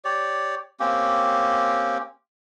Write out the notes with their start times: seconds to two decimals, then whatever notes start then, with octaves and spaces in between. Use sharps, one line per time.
0.05 G4 C#5 D5
0.80 A#3 C4 C#4 G4